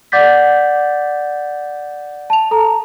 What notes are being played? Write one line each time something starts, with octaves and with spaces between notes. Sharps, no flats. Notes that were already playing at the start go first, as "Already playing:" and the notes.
D5 F#5 D6 G6 A6 B6
A5 F7
A4 A#5